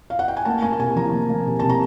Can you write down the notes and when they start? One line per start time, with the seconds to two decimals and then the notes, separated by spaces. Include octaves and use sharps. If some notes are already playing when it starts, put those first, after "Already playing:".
0.10 F5
0.19 F#5
0.28 G5
0.37 G#5
0.45 A#3 A5
0.62 A#3 G#5
0.73 A5
0.79 C3 G#5
0.96 F3 A#5
1.12 A#3
1.30 A#3
1.46 C3
1.60 C3 A5
1.69 A#5